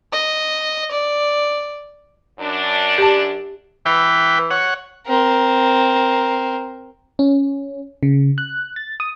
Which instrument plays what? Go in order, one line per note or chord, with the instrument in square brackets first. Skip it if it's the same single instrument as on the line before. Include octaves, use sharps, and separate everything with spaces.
[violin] D#5
D5
[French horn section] F#2 D4
[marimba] G4 A5
[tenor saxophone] E3 [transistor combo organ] B4 G5
[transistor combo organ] C#5 F#5
[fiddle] C4 A#4
[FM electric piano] C#4
C#3
F#6
A6
D#6